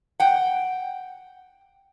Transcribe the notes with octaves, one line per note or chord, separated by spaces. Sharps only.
F#5 G5